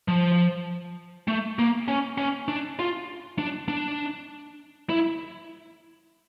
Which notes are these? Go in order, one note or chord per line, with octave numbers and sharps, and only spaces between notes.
F3
A3
A#3
C#4
C#4
D4
F4
D4
D4
E4